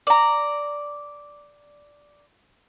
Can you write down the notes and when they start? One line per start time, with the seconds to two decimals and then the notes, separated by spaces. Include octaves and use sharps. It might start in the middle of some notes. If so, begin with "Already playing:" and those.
0.07 D5 A#5